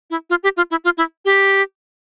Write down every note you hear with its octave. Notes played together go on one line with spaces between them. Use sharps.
E4
F4
G4
F4
E4
F4
E4
G4